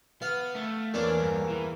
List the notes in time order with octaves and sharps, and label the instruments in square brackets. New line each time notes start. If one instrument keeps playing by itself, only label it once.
[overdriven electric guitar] B3 [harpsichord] F5
[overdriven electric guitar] A3
[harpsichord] E2 A#3 C#4 [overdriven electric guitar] D4
[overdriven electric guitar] G2
E3